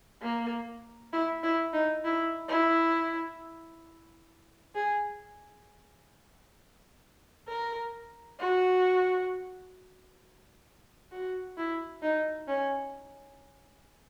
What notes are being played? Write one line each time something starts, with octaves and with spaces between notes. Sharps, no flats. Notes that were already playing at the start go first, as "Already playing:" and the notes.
A#3
E4
E4
D#4
E4
E4
G#4
A#4
F#4
F#4
E4
D#4
C#4